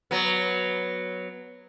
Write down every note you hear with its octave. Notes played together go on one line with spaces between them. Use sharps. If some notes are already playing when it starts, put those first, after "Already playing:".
F#3 B3